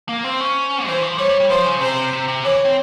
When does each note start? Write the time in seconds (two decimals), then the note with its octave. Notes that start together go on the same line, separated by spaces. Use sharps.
0.09 A#3
0.24 C4 C5
0.40 C#4
0.87 E3 C5
1.03 F3
1.18 G3 C#5
1.29 G3
1.40 G3
1.50 F3 C5
1.66 C#3
1.81 C3 C5
2.13 C3
2.28 C3
2.44 E3 C#5
2.65 C4